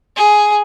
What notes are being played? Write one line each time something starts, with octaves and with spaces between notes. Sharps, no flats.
G#4